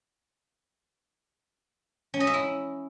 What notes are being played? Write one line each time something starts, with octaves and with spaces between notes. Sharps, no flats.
C#4
D#5
E5
E4